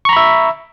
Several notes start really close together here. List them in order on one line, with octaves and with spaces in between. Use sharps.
C#6 A#5 B5 E5